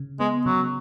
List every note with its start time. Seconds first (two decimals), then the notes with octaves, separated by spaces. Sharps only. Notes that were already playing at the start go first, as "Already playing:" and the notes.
Already playing: C#3
0.20 G#3 B3
0.46 C#3 F#3